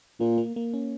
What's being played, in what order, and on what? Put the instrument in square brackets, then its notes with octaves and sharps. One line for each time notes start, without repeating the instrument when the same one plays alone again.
[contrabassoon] A#2 [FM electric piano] A#3
[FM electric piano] A#3
A#3
C#4